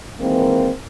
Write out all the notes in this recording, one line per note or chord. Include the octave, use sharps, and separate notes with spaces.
D#3 E3 G#3 A#3 C4